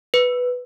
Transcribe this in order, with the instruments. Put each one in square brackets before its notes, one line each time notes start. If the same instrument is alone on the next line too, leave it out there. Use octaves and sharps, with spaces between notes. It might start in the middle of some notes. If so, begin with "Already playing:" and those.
[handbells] B4